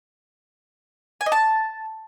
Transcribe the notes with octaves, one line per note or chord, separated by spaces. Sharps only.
G#5
D#5
A5